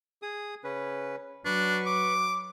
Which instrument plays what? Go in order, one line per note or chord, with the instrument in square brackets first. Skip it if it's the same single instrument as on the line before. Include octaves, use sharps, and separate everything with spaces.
[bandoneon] G#4 D#6
C#3 C#4 B4
[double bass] F#3 [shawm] D4 [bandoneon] B4 C#6
[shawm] D6